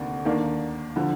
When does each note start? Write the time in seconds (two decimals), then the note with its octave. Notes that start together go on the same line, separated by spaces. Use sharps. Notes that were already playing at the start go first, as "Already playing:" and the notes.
Already playing: D2 C3 D#3 A#3 D4
0.25 D#2 D#3 A#3 D4
0.96 D3 F3